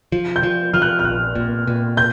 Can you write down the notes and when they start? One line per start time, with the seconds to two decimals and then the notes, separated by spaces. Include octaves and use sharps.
0.12 F3
0.36 G6
0.43 F3
0.73 F3 F6
0.82 F#6
0.99 F6
1.04 A#1 F#6
1.35 A#2
1.67 A#2
1.97 G6